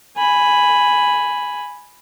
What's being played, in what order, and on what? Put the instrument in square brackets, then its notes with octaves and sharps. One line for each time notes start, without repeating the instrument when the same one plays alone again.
[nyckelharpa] G#5 B5